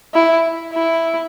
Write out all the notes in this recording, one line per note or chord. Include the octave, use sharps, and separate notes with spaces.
E4
E4